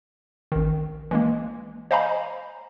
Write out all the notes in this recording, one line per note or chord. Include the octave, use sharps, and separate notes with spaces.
A1 D#3
E3 G#3 A#3
C5 D#5 F5 G#5 A#5 B5